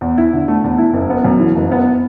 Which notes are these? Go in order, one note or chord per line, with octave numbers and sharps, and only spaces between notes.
E2
E4
D3
A3
E2
E4
F#1
B3
F#2
E3
F#1
B3